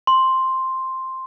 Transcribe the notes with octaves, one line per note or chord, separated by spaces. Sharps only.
C6